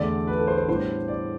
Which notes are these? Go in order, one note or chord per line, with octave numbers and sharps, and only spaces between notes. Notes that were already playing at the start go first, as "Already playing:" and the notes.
Already playing: E2 D3 A3 D5
B4
A4
C5
C5
A2 G3 B3 D4 C5
D5